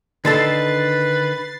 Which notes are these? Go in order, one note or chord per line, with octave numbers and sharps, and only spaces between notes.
D3 D#3 A4 B4 A6 C7